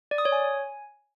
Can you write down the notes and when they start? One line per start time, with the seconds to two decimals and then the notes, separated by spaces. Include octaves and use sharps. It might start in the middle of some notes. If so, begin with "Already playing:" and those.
0.11 D5
0.18 D#6
0.25 C#5
0.32 G#5